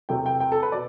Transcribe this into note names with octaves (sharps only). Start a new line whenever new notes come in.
E2 C3 F#3 A3 G5
G5
G5
A4
B4
B2 D5